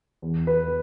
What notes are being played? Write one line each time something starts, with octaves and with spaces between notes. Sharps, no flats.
E2
E2 B4